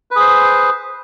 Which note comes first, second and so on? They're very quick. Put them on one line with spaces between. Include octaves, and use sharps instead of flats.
B4 G#4 C5